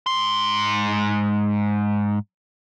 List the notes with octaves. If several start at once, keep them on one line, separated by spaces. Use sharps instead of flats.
G#2 C6